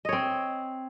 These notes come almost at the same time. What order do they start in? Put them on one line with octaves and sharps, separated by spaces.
D#5 C#5 C4